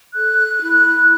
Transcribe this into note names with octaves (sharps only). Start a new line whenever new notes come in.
A4 F#6
E4